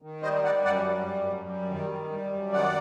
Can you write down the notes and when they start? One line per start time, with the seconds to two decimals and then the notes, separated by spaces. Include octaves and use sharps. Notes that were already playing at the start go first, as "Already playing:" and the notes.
0.02 D#3
0.23 G3 C5 D#5
0.44 G3 D5 F#5
0.64 F#2 D5 F#5
0.86 G3
1.07 F#2
1.27 F#2
1.49 G3
1.69 D#3
1.90 G3
2.11 G3
2.33 F#2
2.53 D#3 D5 F#5